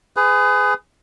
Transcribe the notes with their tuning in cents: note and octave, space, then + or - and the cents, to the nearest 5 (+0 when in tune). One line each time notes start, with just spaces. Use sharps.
G#4 +0 B4 +35